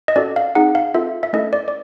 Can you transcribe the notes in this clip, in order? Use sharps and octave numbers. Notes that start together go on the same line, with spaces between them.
D#5
C#4 F#4 A4 D5
F5
C4 D#4 G#4 F#5
F5
C4 F4 A4 E5
E5
A3 C#4 E4 A4 D#5
D5
D5